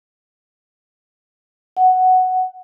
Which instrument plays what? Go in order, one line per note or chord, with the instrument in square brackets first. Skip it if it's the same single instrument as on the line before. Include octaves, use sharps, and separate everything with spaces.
[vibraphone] F#5